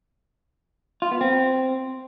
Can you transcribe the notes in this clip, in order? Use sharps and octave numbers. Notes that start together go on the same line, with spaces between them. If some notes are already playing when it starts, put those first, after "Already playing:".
F4
B3
C4